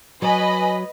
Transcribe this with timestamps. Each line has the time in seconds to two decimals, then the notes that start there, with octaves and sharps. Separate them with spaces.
0.22 F#3 B4 D#5 G#5 B5